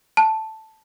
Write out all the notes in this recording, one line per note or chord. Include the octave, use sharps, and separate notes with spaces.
A5